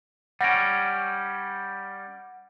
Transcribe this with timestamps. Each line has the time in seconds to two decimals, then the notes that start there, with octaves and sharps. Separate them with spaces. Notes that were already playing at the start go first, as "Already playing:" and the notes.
0.41 G3 C#4 F#5 A#6 D7